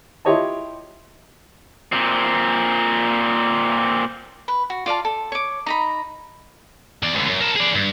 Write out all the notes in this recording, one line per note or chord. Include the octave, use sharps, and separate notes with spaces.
E4 F4 G4 C#5 D#5 A5
A#2 C4
B4
F#4
F4 D5 F5 A5
A4
C#5 D6
D#4 A#5 B5
E2 D5
C#2 D3
F#2
A#4 A5
G#4 D5
G2